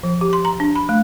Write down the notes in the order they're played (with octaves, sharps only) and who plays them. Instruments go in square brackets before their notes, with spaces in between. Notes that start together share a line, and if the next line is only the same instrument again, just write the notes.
[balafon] F3
G4
C6
A#5
D4
B5
A3